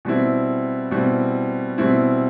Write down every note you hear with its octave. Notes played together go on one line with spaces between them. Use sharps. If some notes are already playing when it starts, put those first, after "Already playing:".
B2 G3 C4 E4
B2 G3 C4 E4
B2 G3 C4 E4